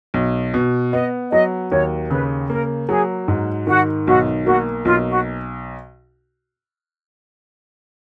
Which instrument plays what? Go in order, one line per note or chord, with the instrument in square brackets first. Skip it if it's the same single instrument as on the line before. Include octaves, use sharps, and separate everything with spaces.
[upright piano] B1
B2
[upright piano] B3 [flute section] D#5
[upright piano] F#3 [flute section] D#5
[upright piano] D#2 [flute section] C#5
[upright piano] C#3 [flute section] B4
[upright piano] A#3 [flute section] A#4
[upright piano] F#3 [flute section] G#4
[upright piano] G#2
[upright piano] D#3 [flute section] F#4
[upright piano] B1 [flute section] F#4
[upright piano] A#3 [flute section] F#4
[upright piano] B1 [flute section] F4
[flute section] F#4